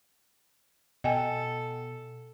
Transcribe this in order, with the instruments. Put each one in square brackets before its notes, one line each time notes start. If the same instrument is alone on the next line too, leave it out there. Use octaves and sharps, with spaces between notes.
[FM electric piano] B2 [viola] A4 [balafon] D#5 G5 G#5